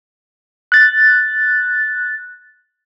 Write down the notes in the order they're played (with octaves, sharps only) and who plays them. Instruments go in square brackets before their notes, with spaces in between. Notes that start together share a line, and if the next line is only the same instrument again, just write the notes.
[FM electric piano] F#6 A6